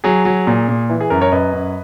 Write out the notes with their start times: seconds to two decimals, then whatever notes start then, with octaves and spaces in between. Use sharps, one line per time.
0.04 F#3 G#4
0.25 F#3
0.47 A#2
0.69 A#2
0.89 E3
1.01 G#4
1.10 F#2 A#4
1.21 A#4 C#5
1.32 F#2 B4 D#5
1.53 F#2